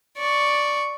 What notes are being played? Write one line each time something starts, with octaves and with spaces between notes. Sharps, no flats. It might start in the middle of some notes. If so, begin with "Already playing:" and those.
D5 C#6